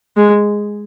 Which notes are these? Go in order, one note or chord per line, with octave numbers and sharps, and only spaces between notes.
G#3